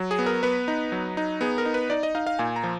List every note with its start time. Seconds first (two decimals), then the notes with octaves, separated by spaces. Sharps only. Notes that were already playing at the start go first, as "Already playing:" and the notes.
Already playing: F#3
0.11 G#4
0.19 B3
0.26 A#4
0.43 B3 B4
0.68 D#4
0.92 F#3
1.17 D#4
1.41 B3 G#4
1.58 A#4
1.66 D#4
1.74 B4
1.90 D#4 D5
2.03 D#5
2.15 D#4 F5
2.27 F5
2.39 A#2 G#5
2.56 A#5
2.64 F3